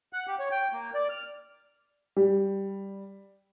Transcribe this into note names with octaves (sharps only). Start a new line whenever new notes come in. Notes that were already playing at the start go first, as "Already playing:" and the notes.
F#5
G4
C#5
G5
A#3
D5
F6
G3